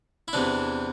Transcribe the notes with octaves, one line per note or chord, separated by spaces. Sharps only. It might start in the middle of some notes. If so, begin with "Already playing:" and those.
E4
E2 C3 E3 D4